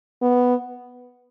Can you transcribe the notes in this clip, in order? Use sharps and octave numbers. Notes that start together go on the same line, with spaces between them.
B3